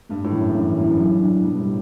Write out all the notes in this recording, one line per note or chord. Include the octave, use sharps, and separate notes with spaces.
G2 A3
A2
E3
F#2
G2 E3
F#2 E4
G2 F#3
D4
B2 G3
A2